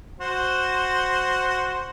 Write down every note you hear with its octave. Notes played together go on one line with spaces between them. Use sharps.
F#4 C5